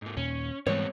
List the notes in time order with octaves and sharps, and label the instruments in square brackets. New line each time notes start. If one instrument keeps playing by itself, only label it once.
[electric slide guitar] G#2 A#3
[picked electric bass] D#2 A#2 [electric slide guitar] C#4
[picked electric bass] G#2 E3 G#3 [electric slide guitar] G3 B3 C4 [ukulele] C#5